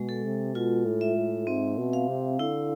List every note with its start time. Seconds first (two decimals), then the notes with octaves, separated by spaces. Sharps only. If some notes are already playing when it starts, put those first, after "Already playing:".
Already playing: B2 G#3
0.09 A4
0.25 C3
0.55 B2 F4
0.86 A2
1.01 E5
1.16 A2
1.47 G#2 C4
1.78 B2
1.93 F5
2.08 C3
2.39 D3 E4